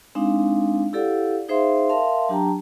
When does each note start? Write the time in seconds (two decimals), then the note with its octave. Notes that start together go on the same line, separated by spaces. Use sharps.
0.15 G#3 C4 D4 D#4 F5
0.93 E4 G4 A4 D5 F5 F#5
1.48 D#4 G#4 C5 E5 F5 C6
1.89 A#4 E5 F5 A5 C6
2.29 F#3 D4 G4 G5 A5 A#5